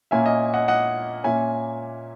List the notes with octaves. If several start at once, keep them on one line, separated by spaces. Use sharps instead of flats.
A#2 A#3 C#4 E5 G#5
D#5
D#5 F#5
D#5 F#5
A#2 A#3 C#4 E5 G#5